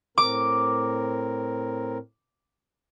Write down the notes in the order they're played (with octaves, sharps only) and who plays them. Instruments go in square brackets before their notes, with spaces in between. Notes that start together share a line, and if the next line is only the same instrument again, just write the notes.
[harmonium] A2 C4 A#4 [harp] D6